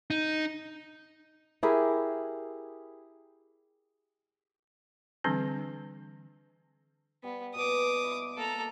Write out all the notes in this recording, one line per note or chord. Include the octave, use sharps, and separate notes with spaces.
D#4
E4 G4 G#4 A#4
D3 E3 G3 C4 D4
G3 B3
B2 D6 D#6
E4
A#3 A4 A#5